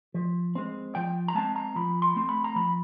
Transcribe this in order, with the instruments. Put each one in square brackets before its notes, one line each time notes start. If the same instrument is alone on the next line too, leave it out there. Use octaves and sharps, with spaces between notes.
[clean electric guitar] F3
G#3 C4
F3 G5
A#5
G#3 C4 A5
A#5
F3 B5
C6
A3 C4
B5
A#5
F3 B5